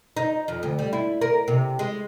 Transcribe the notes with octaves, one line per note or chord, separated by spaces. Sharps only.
D#4
F2
D2
G3
E4
A#4
C3
G#3